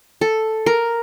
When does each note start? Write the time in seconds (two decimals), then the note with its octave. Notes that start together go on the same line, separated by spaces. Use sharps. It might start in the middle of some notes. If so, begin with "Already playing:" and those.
0.21 A4
0.66 A#4